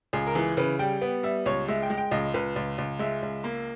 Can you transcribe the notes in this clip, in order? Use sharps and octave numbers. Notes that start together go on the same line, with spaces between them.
C#2 G#4
A#4
E3 G#4
C#3 B4
G3 G5
B3
G3 E5
C#2 C#5
G#3 E5
G5
G#3
G5
C#2 D#5
C#2 B4
C#2
C#2
G#3 E5
C#2
A#3